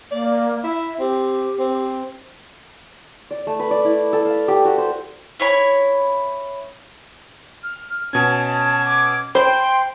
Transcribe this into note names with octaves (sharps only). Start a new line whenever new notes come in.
A#3 D5
E4 E5
C4 G4
C4
D5
A3
B4
D5
E4
A4
F5
G4
F#4
C5
E4 C#5 B5
F6
B2 C#4 A5 G#6
D6
C5 G5 B5 C6